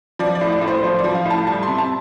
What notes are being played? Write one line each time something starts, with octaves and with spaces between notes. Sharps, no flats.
F3 D5
D5
A2
D5
A2
C5
F3 C5
D5
F3
F5
A2 A5
G3 A5
C6
C3
A5